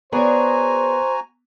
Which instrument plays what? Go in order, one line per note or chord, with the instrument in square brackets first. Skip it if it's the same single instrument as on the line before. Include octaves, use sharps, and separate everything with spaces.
[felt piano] B3 [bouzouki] D4 G#4 C#5 [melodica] F#4 G#5 A#5 [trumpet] C5